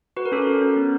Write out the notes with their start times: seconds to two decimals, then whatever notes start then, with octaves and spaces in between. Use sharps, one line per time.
0.17 F#4 B4
0.26 A#4
0.32 C#4 A4
0.42 C#4 A#4
0.62 C#4
0.76 B3